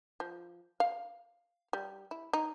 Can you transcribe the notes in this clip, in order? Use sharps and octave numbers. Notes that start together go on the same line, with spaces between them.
F3
F5
G3
E4
D#4